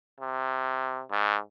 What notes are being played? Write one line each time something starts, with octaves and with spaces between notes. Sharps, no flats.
C3
G#2